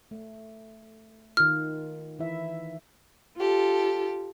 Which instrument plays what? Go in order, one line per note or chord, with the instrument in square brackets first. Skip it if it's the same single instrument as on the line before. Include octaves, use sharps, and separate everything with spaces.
[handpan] A3
[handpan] D#3 F4 [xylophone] F6
[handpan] E3 E4 E5
[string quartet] F4 G4 A4